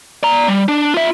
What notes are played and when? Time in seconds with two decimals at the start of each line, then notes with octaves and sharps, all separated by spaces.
0.23 D5 A#5
0.48 G3
0.68 D4
0.94 F4 E5